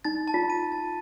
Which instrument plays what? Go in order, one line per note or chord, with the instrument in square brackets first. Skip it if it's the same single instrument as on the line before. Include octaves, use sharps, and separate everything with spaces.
[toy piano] D#4 [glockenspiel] A6
[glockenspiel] A5
[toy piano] F4
[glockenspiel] D#7
A6